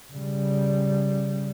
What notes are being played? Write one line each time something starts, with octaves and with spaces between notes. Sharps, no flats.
C#3 G3